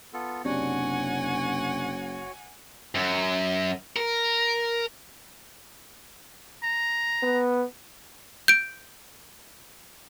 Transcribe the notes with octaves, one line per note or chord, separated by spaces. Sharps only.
B3 F4 A4
F#1 C3 D4 F#4 C#5 F#5 G#5
F#2
A#4
A#5
B3
G6 D7